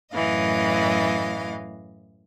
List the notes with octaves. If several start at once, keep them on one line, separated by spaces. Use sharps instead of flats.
F#2 A2 E3 D#5 F5